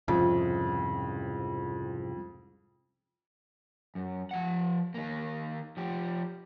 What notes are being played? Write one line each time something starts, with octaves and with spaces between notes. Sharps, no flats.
C2 F2 G#2 C#3
F#2
F3 F#5
D#3 A#3
F3 G4